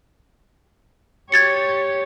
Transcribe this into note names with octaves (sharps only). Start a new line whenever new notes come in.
G4 C#5 G#6 A6 C#7